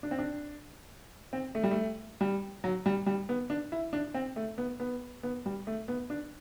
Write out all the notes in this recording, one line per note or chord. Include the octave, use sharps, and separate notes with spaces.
D4
C4
D4
C4
A3
G3
A3
G3
F#3
G3
G3
B3
D4
E4
D4
C4
A3
B3
B3
B3
G3
A3
B3
D4